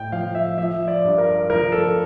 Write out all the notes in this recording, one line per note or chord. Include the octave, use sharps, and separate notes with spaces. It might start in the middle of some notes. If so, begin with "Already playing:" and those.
Already playing: A2 G5
F3 F5
E5
F3 E5
D5
G2
A#4
F3 A#4
A4